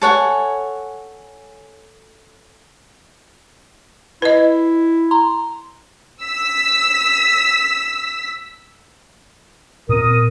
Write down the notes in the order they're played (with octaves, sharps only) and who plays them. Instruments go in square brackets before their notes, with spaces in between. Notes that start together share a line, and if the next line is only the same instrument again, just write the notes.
[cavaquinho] A4 C#5 F#5 G#5
[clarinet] E4 [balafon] B4 D#5
[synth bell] A#5 C6
[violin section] E6 B6
[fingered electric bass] A#2 C4 [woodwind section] A#4 D#6